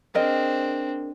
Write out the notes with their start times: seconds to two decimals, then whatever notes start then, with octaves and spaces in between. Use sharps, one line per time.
0.15 C4 D4 G#4 A#4 D#5